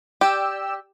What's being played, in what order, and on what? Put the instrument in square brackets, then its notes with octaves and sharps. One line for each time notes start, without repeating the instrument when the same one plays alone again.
[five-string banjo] G4 [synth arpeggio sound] D5 G5 E6